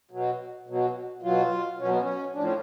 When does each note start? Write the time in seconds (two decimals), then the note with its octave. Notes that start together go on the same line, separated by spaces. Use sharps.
0.11 B2 F#3
0.67 B2 F#3
1.22 B2 F#3 F4
1.79 B2 F#3 C#4
1.90 B3
2.01 C#4
2.34 A2 F3 D4
2.43 C#4